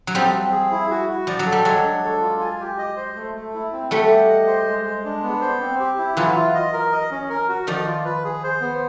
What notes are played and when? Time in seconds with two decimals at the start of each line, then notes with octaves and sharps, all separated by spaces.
0.07 F#3
0.15 F3 G3 C4
0.34 C4
0.52 G#4
0.71 E4
0.91 F#4
1.08 F#4
1.27 F3 D5
1.39 F#3
1.46 A4
1.52 G3
1.65 F#3 G#3 C#5
1.84 D4
2.04 A4
2.21 F4
2.41 G#5
2.60 G4
2.78 D#5
2.97 C5
3.16 A3
3.35 A3
3.54 E4
3.73 C4
3.91 G3 A3 F#5
4.10 G4
4.29 D#5
4.47 C5
4.66 G#3
4.85 G#3
5.05 D4
5.23 B3
5.41 C5
5.61 C4
5.80 G4
5.98 E4
6.17 E3 F#3 F4
6.36 F4
6.55 D#5
6.73 A#4
6.92 D#5
7.11 C#4
7.29 A#4
7.49 F#4
7.67 D#3 F3 D5
7.86 F4
8.05 B4
8.24 G#4
8.43 C5
8.61 B3